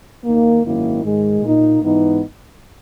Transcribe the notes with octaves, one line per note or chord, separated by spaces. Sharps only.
D#2 D#3 A#3
G#1 F#2 D#3 A#3 E4
G#2 D#3 G#3
A#2 A#3 D#4
G#2 E3 B3 D#4